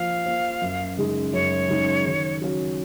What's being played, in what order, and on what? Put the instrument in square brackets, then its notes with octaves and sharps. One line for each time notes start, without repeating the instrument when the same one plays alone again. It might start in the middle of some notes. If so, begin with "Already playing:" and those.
Already playing: [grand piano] F3 A#3 F4 C5 [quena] F5
[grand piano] A#3 F4 C5
F#2
C#3 G#3 D#4 G#4
[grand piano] F#2 [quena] C#5
[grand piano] C#3 G#3 D#4 G#4
D#3
F#3 C#4